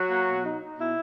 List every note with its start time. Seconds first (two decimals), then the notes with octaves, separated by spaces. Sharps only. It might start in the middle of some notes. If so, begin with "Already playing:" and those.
Already playing: F#3 F#4
0.10 A#3
0.27 B2
0.44 D#4
0.61 D#4
0.78 B2 E4